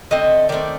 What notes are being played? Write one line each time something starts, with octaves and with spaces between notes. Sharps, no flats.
D3 A3 C4 D#5
D#3 A3 C4 D5